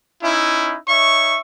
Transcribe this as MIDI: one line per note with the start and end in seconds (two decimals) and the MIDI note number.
0.23 0.76 61
0.23 0.76 63
0.23 0.76 64
0.89 1.38 63
0.89 1.38 73
0.89 1.38 76
0.89 1.38 85